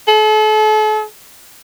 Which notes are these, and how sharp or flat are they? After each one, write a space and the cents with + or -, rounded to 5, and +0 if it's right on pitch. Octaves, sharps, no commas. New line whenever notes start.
A4 -40